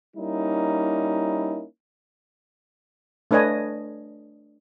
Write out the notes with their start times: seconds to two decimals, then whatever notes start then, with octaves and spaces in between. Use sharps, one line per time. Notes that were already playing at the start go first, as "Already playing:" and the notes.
0.16 G3 A#3 C#4 D#4 E4
3.31 A3 D4 B4 C#5 D#5 G#5